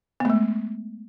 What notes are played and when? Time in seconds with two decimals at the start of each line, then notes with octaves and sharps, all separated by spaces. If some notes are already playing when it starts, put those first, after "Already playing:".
0.20 B3
0.25 A3
0.30 G#3